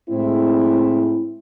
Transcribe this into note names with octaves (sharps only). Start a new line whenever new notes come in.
A2 G#3 C4 E4